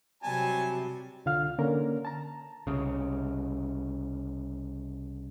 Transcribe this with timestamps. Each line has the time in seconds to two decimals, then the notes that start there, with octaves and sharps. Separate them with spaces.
0.23 C3 F#3 G3 G#5 A5
1.25 C2 D3 F4 F5 F6
1.58 D3 A#3 C#4 A#4
2.05 A5 A#5
2.67 C2 C#3